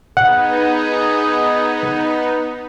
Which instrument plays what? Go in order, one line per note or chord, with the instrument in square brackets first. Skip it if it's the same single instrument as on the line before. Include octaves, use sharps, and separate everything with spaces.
[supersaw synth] B3 D#4 [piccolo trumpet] G#4 [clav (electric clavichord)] F#5